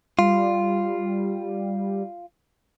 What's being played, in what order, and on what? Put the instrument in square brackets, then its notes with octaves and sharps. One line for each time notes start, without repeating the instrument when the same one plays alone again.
[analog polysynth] G3 [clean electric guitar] F4